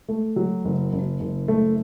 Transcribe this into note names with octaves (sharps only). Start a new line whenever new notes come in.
A3
F#3
F#1
F#1
F#1
A3